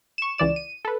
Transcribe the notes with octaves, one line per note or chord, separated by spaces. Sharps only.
C#6 E7
C#2 E3 D5 E7
D#7
A4 B4